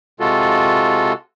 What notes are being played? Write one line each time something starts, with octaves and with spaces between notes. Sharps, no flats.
C3 G#3 F4 F#4 A4